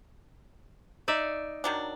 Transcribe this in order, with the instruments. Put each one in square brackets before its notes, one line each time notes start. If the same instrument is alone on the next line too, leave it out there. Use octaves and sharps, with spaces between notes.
[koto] D#4 D5 E5
[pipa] D#3 F#3 D4